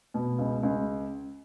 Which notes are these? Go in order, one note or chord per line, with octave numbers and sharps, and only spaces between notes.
B2
C#2
C#2